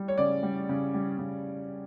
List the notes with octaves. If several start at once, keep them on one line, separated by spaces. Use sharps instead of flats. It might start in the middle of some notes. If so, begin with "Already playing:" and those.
Already playing: G3
C#5
C#3 D5
G3
C#3
G3
C#3